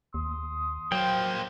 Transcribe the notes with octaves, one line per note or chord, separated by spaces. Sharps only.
D#2 C6 D#6
F#3 A#3 C5 G5